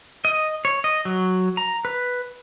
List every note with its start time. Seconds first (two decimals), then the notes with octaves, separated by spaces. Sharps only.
0.25 D#5
0.65 C#5
0.84 D#5
1.05 F#3
1.57 A#5
1.85 B4